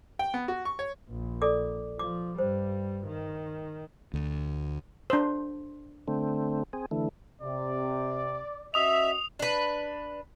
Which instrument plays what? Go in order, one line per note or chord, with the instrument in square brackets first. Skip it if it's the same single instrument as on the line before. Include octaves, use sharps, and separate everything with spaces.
[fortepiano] G5
B3
F#4
C#6
C#5
[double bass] A#1
[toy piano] A4 D5 D6
[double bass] F3 [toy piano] D6
[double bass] G2 G3 [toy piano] C5
[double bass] D#3
[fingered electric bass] D2
[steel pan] D4 C5
[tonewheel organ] D3 A3 C4
C4 G#4
D3 E3 A3
[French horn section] C3 [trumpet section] D5
[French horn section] C#4 F#4 D#5 [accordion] E5 [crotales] D#6 F7
[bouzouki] D4 B4